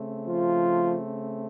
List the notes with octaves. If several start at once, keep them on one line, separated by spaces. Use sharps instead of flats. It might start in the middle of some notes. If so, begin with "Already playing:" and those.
Already playing: C#3 A3 C4
F3 F4